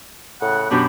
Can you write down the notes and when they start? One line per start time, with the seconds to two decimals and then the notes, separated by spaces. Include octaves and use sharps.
0.42 A2 C#3 F#5
0.71 F#2 B2 D4 G4